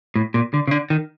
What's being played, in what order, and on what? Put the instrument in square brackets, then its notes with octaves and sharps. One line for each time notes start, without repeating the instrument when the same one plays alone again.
[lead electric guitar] A2
A#2
D3
C#3
D3
D#3